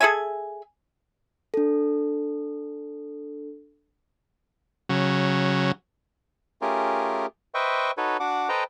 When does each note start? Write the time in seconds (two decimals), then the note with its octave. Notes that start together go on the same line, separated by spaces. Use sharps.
0.01 G#4 A4 E5 G#5
1.54 D4 A4
4.89 C#3 F#3
6.61 A3 C#4 F4 G4 G#4 A#4
7.54 B4 C5 D#5 E5 G5 C#6
7.97 D#4 F#4 A4 B4 C#5
8.20 D4 F#4 F#5 D6
8.49 A4 B4 C5 D#5 G5 A#5